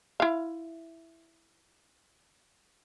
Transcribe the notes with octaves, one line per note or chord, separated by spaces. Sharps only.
E4 F5